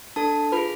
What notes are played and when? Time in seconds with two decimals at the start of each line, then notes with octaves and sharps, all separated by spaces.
0.16 D4 A4 A5
0.52 F4 G#4 B4 B5